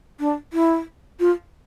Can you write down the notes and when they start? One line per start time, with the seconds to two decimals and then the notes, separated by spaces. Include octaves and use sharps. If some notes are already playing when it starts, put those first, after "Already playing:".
0.20 D4
0.53 E4
1.20 F4